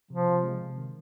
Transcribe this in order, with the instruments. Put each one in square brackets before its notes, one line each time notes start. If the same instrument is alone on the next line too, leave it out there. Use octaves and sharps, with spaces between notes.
[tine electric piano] C3 [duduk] F3
[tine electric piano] C3
G#3
C3
D#3